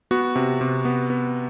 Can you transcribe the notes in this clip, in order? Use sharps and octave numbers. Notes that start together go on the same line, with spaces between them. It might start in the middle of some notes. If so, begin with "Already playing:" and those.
B3 F#4
C3
C3
B3
B3